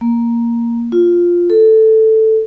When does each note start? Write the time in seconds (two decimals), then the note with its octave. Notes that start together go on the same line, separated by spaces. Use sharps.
0.01 A#3
0.92 F4
1.50 A4